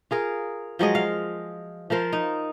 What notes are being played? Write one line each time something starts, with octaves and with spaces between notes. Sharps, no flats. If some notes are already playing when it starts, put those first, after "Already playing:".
F4 G#4 A#4
F3 F#3 G#3 D#5
F5
F3 F4 A#4 C5
D#4